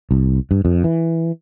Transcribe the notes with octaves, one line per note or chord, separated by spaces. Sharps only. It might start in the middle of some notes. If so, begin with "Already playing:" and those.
C2
G2
F2
E3